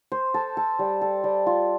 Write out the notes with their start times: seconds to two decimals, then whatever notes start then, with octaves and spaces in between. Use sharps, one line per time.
0.12 C5
0.34 A4
0.57 A4
0.79 G3
1.01 A4
1.24 G3
1.46 F4